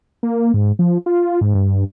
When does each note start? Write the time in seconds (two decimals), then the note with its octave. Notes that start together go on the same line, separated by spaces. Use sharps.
0.23 A#3
0.54 G#2
0.79 F3
1.06 F4
1.41 G#2
1.55 G2